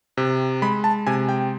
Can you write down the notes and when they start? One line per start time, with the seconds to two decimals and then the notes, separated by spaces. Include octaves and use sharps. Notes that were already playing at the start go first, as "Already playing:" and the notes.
0.17 C3
0.62 G#3 B5
0.84 A5
1.07 C3 G#5
1.29 G5